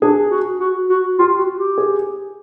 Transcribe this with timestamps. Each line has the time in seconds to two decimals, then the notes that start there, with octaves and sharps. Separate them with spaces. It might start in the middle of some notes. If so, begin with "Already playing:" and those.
0.02 D4 G#4
0.31 F#4
0.60 F#4
0.90 F#4
1.19 F4 G4
1.38 F#4
1.58 G4
1.78 G#4